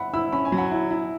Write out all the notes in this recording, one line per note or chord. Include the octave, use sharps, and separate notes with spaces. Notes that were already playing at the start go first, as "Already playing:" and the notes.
Already playing: E5 F#5 B5
E4 B5 E6
C#4 B5
G#5
F#3
F#5 B5
E4
E4